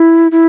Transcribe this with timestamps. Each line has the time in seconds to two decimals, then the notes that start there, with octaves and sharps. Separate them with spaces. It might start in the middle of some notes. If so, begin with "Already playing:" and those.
Already playing: E4
0.32 E4